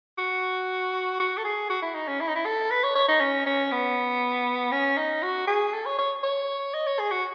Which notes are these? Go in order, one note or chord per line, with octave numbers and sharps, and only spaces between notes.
F#4
F#4
A4
G#4
F#4
E4
D#4
C#4
E4
D#4
E4
A4
B4
C#5
C#5
D#4
C#4
C#4
B3
C#4
D#4
F#4
G#4
A4
C#5
C#5
C#5
D#5
C#5
G#4
F#4